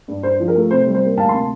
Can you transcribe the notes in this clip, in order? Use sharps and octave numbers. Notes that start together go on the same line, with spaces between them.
G2
G2 C5
F3
A#4
A3
C3 C5
G3
C5
A#3
D2 F5 A5
A5 C6
C3